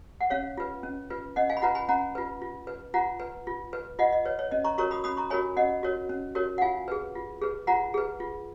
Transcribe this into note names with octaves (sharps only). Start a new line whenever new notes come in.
F#5
C#4 C#5 F5
F4 B4
C#4
F4 B4
C#4 D#5 F#5
F5 G#5
B5
F4 B4 F#5 A#5
G#5 B5
C#4 F#5 A#5
F4 B4
F4
B4
F4 F#5 A#5
B4
F4
B4
F4 D#5 F#5
D#5
B4 C#5
C#5
C#4 D#5
A#5 C#6
F#4 A#4 C#5 A#5 C#6
B5 D#6
C#4 B5 D#6
A#5 C#6
F#4 A#4 C#5 G#5 B5
C#4 D#5 F#5
F#4 A#4 C#5
C#4
F#4 A#4 C#5
F#5
F4 F5 G#5
G#4 B4
F4
G#4 B4
F4 F#5 A#5
G#4 B4
F4